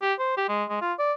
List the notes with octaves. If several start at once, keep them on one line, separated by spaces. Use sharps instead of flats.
G4
C5
G4
G#3
G#3
F4
D5